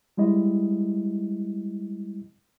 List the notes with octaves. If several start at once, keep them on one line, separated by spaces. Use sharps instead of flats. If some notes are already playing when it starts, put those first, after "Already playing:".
G3 G#3 E4 D#5